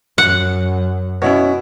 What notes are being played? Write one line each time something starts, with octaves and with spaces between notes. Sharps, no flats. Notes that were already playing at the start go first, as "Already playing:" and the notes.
F#2 F#5
B2 C#4 E4 C#5